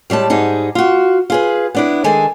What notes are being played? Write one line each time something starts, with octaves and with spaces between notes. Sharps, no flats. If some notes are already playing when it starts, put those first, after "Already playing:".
A2 G3 G#3 A5
G#2 G3 D#4 G#4
F4 F#4
F4 G#4 B4
B3 D4 E4
D#3 G#3 G#4 A4 G#5